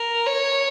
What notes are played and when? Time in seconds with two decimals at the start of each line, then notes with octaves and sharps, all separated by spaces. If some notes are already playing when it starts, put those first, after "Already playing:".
Already playing: A#4
0.26 C#5